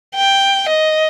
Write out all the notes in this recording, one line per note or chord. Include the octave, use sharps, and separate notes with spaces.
G5
D#5